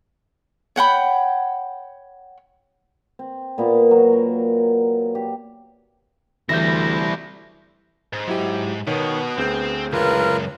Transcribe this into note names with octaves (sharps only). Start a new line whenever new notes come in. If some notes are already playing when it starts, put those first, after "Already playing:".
C#5 F#5 G5 B5
C4
A#2 B3 A#5 D6
F#3 F#4 A#4
A#4
G4
D2 E3 G3 E4 G6 A#6
G#2
F#3 E4 G4
B2 D#3 B3 C#5
D2 C4 G#4 G6
C#2 F#2 F4 A#4 B4